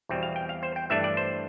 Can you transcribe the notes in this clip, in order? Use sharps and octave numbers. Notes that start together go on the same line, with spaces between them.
E2 B2 G3 C4
F5
G5
F5
C5
G5
G2 E3 A3 D4 E5
D5
C5